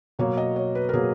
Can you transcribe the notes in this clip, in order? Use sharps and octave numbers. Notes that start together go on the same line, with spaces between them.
B2 F#3 A#3 C#5
D#5
C#5
B4
A#4
B2 F#3 A#3 G#4